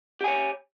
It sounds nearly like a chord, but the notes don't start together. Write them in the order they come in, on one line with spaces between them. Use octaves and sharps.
G4 G#5 C#5